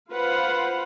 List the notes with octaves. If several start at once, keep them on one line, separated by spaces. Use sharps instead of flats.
F4 B4 C5 F5 F#5